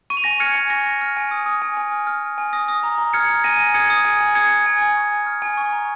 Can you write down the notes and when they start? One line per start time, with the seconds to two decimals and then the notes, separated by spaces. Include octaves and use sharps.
0.10 C#6 D#7
0.17 F7
0.24 G#5 A#6 D#7
0.40 F6 G#6 C#7
0.55 G#5
0.70 C#6 A#6
0.86 G#5
1.02 F6
1.17 G#5
1.31 D#6
1.46 D#6
1.62 G#5
1.77 G#5
1.92 F6
2.07 F6
2.23 G#5
2.38 G#5
2.53 D#6 A#6
2.68 D#6
2.83 A#5
2.98 A#5
3.13 F6 G#6 C#7
3.30 F6
3.44 G#5 A#6 D#7
3.59 G#5
3.74 D#6 G#6 C#7
3.90 D#6
4.05 G#5
4.21 G#5
4.35 D#6 G#6 C#7
4.51 D#6
4.66 G#5
4.82 G#5
4.97 C#6
5.12 G#5
5.26 F6
5.42 G#5
5.57 C#6
5.73 A#5